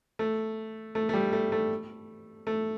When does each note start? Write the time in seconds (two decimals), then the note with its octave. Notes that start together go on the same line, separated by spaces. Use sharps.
0.19 A3
0.95 A3
1.09 A3
1.14 G3
1.33 A3
1.52 A3
2.47 A3